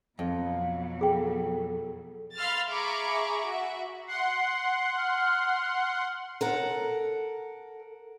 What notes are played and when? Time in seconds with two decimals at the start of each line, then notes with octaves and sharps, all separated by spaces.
0.19 F2 B2 F#3 F5
1.01 G#4 A4 G5
2.36 F5 B5 C6 E6 F6 A6
2.70 G#4 E5 A#5 B5 C#6 D6
3.46 F#4 E5
4.08 F#5 C6 C7
4.97 F6
6.41 A4 A#4 F#5